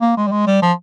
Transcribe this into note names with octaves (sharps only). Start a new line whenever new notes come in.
A#3
G#3
G3
G#3
G3
F3